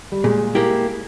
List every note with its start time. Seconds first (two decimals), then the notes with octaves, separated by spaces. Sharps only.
0.12 G3
0.24 A#2 G#3
0.55 A#3 E4 G4